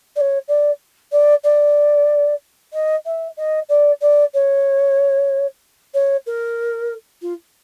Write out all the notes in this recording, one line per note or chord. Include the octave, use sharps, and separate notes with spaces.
D5
C#5
D5
D5
D5
D#5
E5
D#5
D5
D5
C#5
C#5
A#4
F4